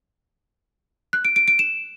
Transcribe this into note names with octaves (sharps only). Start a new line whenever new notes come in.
F#6
D7
D7
D7
E7